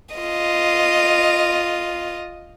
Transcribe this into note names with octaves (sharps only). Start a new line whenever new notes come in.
F4 D#5